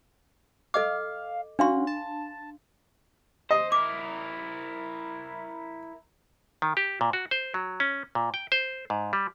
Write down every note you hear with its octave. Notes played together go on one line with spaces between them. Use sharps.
A4 D#5 F5 D6
C#4 D4 F#4 F5 C6
A5
C5 D#5
E4 A#4 D6
D#3
G4
A#2
F#4
C5
F#3
C#4
A#2
G5
C5
G#2
G3